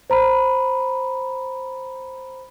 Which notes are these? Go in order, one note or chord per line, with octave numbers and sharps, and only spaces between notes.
C5 A#5 B5